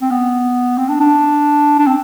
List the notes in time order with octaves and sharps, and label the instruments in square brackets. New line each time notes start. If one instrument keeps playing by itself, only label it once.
[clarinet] C4
B3
C4
D4
D4
D4
C4